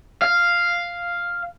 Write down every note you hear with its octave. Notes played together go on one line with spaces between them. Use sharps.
F5